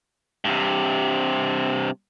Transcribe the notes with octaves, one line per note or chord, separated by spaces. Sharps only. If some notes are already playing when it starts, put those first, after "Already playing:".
G2 C3